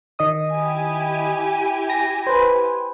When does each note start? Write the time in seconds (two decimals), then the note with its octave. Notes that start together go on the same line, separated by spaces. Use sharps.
0.19 D#3 D#5 D#6
0.52 E4 G4 G#5
1.90 A#6
2.27 B4 C5